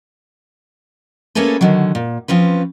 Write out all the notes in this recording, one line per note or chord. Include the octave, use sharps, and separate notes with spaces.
A3 A#3 C#4 G#4 A4 B4
D3 D#3 F#3
A#2
F3 C4 C#4 B4